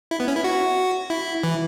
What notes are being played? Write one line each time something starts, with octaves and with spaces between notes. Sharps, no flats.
E4
B3
C#4
E4
F#4
E4
E3